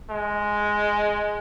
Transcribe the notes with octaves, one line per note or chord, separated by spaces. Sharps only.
G#3